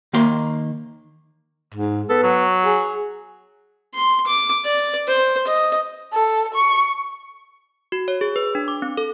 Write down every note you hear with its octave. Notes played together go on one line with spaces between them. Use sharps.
D#3 A#3 C6
G#2
B3 A4
F#3
G#4
C6
D6
D5
C5
D#5
A4
C#6
F#4
C#5
G#4
B4
D4
D6
C4
A4